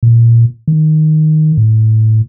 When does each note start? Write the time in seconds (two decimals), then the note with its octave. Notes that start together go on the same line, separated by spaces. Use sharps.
0.03 A#2
0.68 D#3
1.57 A2